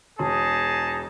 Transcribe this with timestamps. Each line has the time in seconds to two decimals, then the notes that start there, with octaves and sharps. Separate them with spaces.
0.19 E1 D#4 G#4 A5